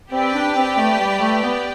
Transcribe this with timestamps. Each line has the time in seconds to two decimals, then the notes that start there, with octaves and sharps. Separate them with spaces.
0.11 C4 G4 B4 D5 G5
0.34 D4
0.55 C4
0.77 A3
0.99 G3
1.20 A3
1.42 B3